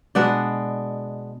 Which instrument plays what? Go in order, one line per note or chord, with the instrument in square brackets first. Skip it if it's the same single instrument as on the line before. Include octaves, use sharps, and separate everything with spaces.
[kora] B2 G#3 B3 D4 D5 F#5